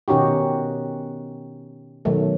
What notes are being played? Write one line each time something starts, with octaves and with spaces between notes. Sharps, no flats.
B2 D#3 C#4 D#4 F#4 G4
B2 D#3 F#3 A3